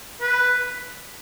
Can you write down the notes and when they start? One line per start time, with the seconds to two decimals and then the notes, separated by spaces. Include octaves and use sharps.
0.21 B4